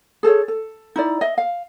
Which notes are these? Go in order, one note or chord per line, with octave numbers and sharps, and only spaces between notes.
G#4 A4 C5 C#5
A4
D#4 E4 D5
D#5 E5
F5